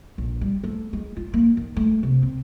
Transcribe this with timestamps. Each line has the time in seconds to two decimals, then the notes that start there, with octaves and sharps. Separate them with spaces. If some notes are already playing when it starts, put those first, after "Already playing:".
0.18 A#1
0.41 G3
0.63 A3
0.93 G#3
1.16 F4
1.34 A#3
1.57 D#3
1.76 A3
2.03 C3
2.23 C4